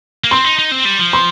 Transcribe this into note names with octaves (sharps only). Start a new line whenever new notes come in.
A#3
C4 C6
D#4
D#4
C4
G3
F3
C6